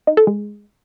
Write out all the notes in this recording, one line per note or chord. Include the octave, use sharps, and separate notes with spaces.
D#4
A4
G#3